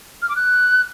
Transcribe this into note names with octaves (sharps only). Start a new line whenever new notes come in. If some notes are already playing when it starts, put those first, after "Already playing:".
F6
D6
F#6